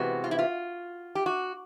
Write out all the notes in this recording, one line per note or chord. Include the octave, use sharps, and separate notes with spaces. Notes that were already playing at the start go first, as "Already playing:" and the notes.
Already playing: C3 E3 G#3 B3 F#4
F4
E4
F4
G4
F#4